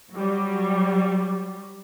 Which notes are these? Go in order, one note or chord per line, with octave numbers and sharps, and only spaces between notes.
F#3 G3